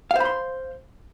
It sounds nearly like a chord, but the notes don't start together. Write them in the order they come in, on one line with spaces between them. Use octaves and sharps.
F5 C5 B5 C6